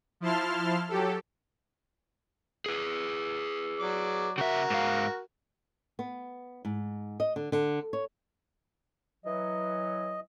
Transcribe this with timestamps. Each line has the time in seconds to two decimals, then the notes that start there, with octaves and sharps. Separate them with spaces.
0.20 F3 E4 A5 C6 F6
0.89 F#3 G4 A4
2.66 G#4 B4
3.79 F#3 D5 D6
4.38 C#3 F#4 A#4 E5
4.70 G#2 F5
5.99 B3
6.65 G#2
7.20 D#5
7.36 D3
7.52 D3
7.93 C#5
9.25 E3 F#3 D#5